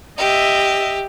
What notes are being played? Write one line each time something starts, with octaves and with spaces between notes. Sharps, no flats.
G4 D#5 E5